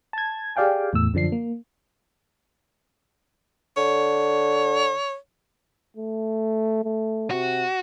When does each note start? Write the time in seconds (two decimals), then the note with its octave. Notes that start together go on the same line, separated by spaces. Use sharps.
0.13 A5 G#6
0.56 G4 G#4 D5 F5 G5 G#5
0.93 E2 A2 E6
1.14 F#2 D3 F3 D4 C7
1.32 A#3
3.77 D3 C#5
5.96 A3
6.84 A3
7.31 C3 F#4